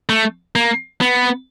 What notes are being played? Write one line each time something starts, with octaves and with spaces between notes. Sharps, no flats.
A3
A#3
B3